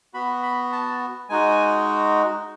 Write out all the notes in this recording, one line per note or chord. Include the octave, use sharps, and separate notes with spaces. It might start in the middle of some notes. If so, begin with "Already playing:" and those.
B3 F#4 B5
B5
A5
G#3 D#4 F#4 G#5